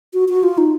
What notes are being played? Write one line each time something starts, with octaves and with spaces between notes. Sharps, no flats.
F#4
F#4
F4
D#4